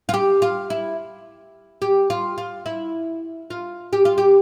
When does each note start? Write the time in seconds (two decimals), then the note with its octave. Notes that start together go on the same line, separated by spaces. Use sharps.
0.09 F4
0.14 G4
0.42 F4
0.70 E4
1.82 G4
2.10 F4
2.38 F4
2.66 E4
3.50 F4
3.93 G4
4.05 F4
4.18 G4